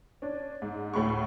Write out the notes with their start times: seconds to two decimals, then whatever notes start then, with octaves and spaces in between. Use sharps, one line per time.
0.22 C#4 D4
0.62 G#2
0.94 D2 A2 B5 C#6